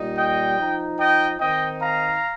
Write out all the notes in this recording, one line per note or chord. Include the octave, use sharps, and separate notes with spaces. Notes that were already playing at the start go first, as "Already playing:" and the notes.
Already playing: A#2 G3 D#4
D#5 G5
F3 D#4
D#5 G5
D#3 C4 D#4 D#5 G5
F5 A#5